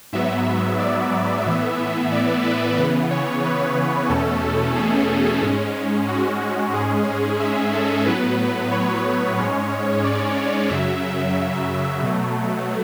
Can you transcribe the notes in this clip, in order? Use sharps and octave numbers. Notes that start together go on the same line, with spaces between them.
G#2 F#3 B3 E5
D5
D5
A2 E3 B3 E5
D5
B4
C#3 E3 B3 B4
C#5
B4
E2 B2 A3 C#4 A4
G#4
G#2 G#3 C#4
F#4
G#2 G#3 C#4 G#4
E5
A4
A2 F#3 B3 B4
C#5
G#2 G#3 C#4 C#5
D5
F#2 C#3 F#3 E5
B2 F#3 A3